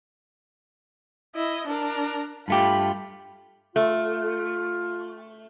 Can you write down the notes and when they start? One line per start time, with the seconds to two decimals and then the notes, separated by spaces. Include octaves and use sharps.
1.36 E4 D#5
1.67 D4 A#4
2.48 G2 A3 F4 G4 B5
3.76 A3 F4